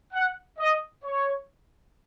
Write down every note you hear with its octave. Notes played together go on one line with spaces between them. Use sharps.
F#5
D#5
C#5